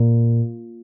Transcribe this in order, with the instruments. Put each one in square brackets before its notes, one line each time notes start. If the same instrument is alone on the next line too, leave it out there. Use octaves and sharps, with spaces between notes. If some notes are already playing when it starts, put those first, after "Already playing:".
Already playing: [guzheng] A#2